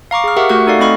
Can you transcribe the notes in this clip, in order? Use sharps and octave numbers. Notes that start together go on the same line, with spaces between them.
F5 A#5 C#6 D6
G#4 F6
G4 A#4 E5 F#5 C#6
A3 F#4 F#5 C#6 F#6
D#4 A4 D5 F5
A3 C4 D#5 B5 C#6 F6